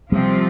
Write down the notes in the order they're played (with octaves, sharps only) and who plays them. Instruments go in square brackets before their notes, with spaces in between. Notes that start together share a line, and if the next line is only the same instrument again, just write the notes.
[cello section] C3 F3 C4 F4 [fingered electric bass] G3